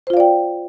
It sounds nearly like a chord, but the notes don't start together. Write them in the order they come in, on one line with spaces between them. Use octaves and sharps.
C5 F4 F5 D5 G5